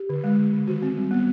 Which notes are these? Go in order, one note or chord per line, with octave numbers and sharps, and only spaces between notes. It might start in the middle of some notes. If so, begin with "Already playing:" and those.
Already playing: G4
D3
G#3
D3
D3
D#3 F#4
C4
G3
B3